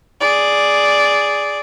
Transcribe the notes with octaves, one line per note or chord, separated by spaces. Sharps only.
G#4 D5